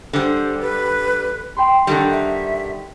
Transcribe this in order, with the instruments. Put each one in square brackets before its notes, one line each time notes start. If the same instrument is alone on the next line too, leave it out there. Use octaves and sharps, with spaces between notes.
[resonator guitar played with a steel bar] D3 G3 [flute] C5
[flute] B4
[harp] G5 B5 C6
[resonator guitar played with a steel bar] D3 D#3 G3 [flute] A4
[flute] E5